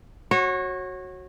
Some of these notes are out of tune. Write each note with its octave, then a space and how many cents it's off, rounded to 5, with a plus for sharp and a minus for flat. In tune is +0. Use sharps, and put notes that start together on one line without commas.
F#4 +0 C#5 -25